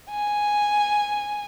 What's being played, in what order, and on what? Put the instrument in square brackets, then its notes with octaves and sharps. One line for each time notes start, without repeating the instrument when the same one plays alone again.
[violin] G#5